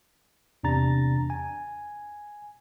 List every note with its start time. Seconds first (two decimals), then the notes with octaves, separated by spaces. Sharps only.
0.63 E2 C3 D4 A#5 A6
1.30 G#5